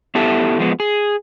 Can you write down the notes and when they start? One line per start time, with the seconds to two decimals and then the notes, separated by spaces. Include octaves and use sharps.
0.15 B3 E4 G4 A4 E5 A5
0.59 F3 G#3 B3
0.80 G#4